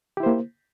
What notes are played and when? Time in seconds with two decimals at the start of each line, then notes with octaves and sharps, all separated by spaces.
0.17 G4
0.20 E4
0.23 C5
0.26 A#3